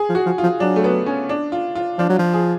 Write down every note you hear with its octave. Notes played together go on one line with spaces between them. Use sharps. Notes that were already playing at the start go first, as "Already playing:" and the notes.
Already playing: G#4
F3
F#4
F3
F3 F4
F#3 D4
A3
B3
C#4
D4
F4
F4
F3 D4
F#3
F3 F4
G#4